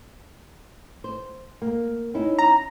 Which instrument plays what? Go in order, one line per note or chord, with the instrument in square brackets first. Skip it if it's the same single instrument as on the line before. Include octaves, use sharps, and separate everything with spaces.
[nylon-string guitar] C5
A#3
C#4 D#4 E4
[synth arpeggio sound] A#5